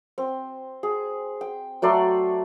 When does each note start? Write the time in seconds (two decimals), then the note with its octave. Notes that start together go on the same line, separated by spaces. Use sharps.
0.18 C4
0.83 G#4
1.41 G5
1.82 F#3 A3 D5 C6